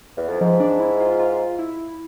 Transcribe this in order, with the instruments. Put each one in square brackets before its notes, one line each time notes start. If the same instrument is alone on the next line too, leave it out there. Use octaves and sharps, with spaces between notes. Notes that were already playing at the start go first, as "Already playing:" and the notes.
[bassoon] E2
F2
[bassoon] G#2 [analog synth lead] F3
[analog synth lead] D4
E4
F4
F4
E4